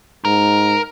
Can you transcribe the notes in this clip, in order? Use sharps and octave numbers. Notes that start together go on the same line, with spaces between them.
G#2 A#4